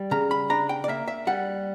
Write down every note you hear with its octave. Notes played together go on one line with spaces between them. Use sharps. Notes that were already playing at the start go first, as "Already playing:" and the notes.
Already playing: G3
C#3 A#5
B5
D4 A#5
G5
D5
A#3 E5
E5
G3 F#5